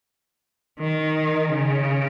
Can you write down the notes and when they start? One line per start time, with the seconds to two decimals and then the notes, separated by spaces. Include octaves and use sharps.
0.78 D#3
1.52 C#3